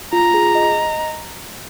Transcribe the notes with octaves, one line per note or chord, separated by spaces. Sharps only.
F4 A#5
G#4
D#5